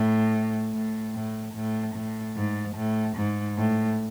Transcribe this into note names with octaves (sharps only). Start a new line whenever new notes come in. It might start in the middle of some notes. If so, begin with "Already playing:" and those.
Already playing: A2
A2
A2
A2
A2
G#2
A2
G#2
A2